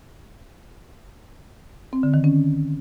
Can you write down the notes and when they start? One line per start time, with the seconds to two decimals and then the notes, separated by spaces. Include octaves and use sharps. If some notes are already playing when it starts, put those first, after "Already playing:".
1.93 C4
2.03 D3
2.14 D#3
2.24 C#4